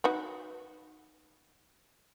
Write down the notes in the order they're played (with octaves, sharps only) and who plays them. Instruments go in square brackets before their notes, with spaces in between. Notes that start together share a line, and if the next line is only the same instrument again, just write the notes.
[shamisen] D#4 F#4 B4